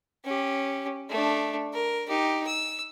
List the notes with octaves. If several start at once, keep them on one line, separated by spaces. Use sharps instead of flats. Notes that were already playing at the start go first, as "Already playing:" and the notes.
C#4 G4
A3 D4
A#4
D#4 G4
E6